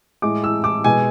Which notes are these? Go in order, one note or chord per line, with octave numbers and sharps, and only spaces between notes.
A2 G#3 D6
E6
D6
B2 G#3 G#5